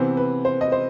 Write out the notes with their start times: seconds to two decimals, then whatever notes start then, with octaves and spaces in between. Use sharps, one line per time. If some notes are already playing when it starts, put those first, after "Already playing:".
Already playing: C3 E3 B3 C5
0.17 B4
0.45 C5
0.61 D#5
0.72 C5